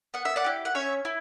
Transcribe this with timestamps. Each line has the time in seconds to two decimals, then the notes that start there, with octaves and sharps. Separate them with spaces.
0.14 B3 F#5
0.25 E5
0.36 D5 F#5
0.44 E4 G4
0.65 F#5
0.75 C#4 C#5 E5
1.05 E4